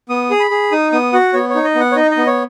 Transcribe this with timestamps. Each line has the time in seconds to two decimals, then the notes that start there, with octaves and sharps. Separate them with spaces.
0.09 B3 D#6
0.31 G#4
0.40 B5
0.51 G#4
0.72 D#4 D#6
0.92 B3 D#6
1.13 F#4 F#5
1.33 B3 C#5
1.49 C#5
1.55 D#4
1.64 D#5
1.75 B3
1.80 F#5
1.92 C#5
1.96 D#4 D#5
2.11 D#5
2.17 B3
2.27 C#5